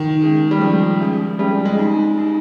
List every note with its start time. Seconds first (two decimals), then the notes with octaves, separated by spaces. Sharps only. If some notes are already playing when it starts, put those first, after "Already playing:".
Already playing: D#3
0.22 G#3 C#4 G#4
0.51 G3
0.61 F3 G#3 C#4 G#4
1.00 G#3 C#4 G#4
1.39 G3 G#3 C#4 G#4
1.65 G#3
1.78 C4 D#4 G4
2.17 C4 D#4 G4